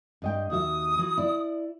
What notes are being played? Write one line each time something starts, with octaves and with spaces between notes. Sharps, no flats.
G2 D#5 G5
D#2 F#4 E5 D#6
E3 F#4
E4 D5